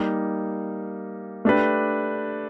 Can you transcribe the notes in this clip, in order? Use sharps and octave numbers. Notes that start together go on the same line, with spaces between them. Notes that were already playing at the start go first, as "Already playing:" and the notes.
Already playing: G3 A#3 D#4
A3 D4 G4 B4